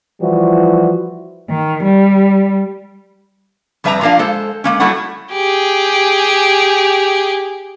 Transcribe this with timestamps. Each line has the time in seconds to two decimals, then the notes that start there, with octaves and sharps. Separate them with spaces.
0.21 E3 F3 G3 E4 F#4
1.49 D#3
1.84 G3
3.84 F2 G3 B4 E5 G#5 A#5
4.01 A#2 F3 A#3 D4 F5
4.19 G#3 A4 C5
4.64 G#3 A#3 C#4
4.80 F#3 G3 A3 E4 F#4 F#5
5.32 G4 G#4